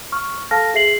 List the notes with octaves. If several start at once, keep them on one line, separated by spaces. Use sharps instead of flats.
C#6 F6
A4 F5 A5 F6 A#6
G#4 E5 C7 F#7